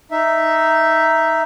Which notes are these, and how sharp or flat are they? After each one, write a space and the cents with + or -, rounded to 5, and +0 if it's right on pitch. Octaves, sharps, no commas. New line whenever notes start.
D#4 +0 E5 +0